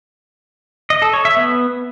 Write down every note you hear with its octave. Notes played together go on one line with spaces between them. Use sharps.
D#5
A4
C#5
E5
B3